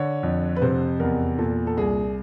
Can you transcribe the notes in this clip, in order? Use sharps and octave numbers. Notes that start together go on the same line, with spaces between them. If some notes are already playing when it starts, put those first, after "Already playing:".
Already playing: D3 C#5
F2
B4
C3 C5
E2 A#4
A#2 A4
A4
C2 G#4